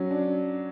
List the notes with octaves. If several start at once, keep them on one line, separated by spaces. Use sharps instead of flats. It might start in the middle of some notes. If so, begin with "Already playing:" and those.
Already playing: F#3 C#4
D4